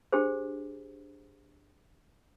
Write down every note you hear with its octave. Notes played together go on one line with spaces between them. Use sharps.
D4 G4 G#4 C5